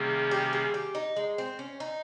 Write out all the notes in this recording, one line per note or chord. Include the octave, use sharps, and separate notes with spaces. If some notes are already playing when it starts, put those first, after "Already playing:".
Already playing: C3 D#3 G3 A#3 C#4 G#4
G4
G#4
G4
D#4
G#3
C4
C#4
D#4